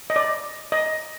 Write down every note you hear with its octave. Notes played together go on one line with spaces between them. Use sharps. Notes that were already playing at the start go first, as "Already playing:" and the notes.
D#5
D5
D#5